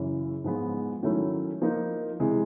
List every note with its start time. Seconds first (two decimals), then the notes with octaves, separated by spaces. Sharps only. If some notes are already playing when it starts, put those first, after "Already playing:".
Already playing: F#2 C#3 E3
0.44 G#2 F3 G#3 B3
1.03 D#3 F#3 A3 C#4 E4
1.62 F3 A#3 D#4
2.20 C3 E3 G#3